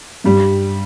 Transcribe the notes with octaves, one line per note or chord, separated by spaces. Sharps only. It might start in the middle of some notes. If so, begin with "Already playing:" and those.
G2 G3